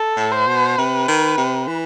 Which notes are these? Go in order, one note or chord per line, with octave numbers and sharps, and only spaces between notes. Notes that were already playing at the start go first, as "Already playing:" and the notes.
Already playing: A4
A2
C5
B2
C3 B4
D#3
C3
E3